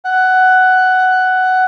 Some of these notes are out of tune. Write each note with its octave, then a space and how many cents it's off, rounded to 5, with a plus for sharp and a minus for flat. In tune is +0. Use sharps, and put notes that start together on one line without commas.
F#5 +10